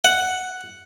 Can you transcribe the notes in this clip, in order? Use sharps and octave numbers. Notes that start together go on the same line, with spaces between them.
F#5